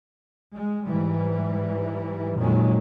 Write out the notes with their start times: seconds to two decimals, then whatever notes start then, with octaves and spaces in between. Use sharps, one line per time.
0.53 G#3
0.87 G#2 E3 G3
2.37 F2 A#2 D#3 F#3 G#3